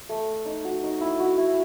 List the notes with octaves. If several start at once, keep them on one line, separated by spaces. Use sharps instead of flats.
A3
D#4
F#4
D#4
E4
F#4
E4